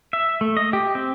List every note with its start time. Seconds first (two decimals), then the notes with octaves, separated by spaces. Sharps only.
0.13 E5
0.41 A3
0.57 D#5
0.73 G4
0.95 C4